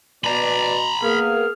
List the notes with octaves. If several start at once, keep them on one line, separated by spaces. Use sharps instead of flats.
B2 D5 A#5 B5
A#3 B3 G#4 F6